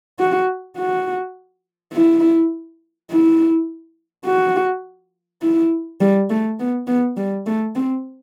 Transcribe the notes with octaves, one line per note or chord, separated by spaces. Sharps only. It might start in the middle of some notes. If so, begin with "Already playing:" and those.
F#4
F#4
E4
E4
F#4
E4
G3
A3
B3
B3
G3
A3
C4